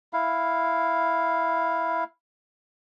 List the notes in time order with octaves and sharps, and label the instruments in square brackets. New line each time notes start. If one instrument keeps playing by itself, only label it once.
[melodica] E4 F5